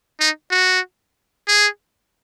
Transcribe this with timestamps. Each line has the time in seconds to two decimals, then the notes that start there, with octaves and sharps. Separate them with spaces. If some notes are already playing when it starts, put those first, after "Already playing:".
0.20 D#4
0.51 F#4
1.48 G#4